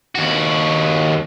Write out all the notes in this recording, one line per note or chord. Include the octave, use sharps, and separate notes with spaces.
D#2 F#4